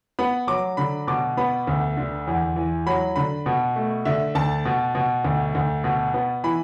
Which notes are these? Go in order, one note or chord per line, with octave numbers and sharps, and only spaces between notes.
B3 B5
F#3 D6
D3 B5
B2 D6
B3 B5
D2
D3
E2
E3
F#3 B5
D3 B5
B2
A3
D3 E5
D2 A5
B2
B2
D2
D2
B2
B3
E3 B5